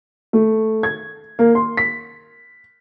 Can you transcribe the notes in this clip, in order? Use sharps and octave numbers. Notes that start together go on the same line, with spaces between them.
A3
G#6
A#3
C6
B6